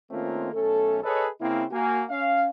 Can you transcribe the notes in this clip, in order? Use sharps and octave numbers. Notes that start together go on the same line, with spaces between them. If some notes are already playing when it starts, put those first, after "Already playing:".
D#3 A3 A#3 C4 C#4 F4
B1 A3 C#4 A4
G#4 A4 B4 C#5 D#5
C#3 A#3 C4 E4
A#3 F#4 G#5
C#4 F5